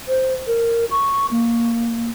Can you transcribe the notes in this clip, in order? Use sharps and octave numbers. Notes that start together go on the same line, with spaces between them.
C5
A#4
C#6
A#3